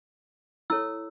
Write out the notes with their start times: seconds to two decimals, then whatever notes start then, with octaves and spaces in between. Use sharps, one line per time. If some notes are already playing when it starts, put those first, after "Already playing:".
0.70 E4 A4 C#5 E6